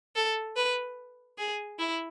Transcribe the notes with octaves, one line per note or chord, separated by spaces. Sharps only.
A4
B4
G#4
E4